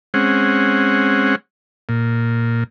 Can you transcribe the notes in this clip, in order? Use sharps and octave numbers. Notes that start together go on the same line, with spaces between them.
G#3 C4 C#4 F#5
A#2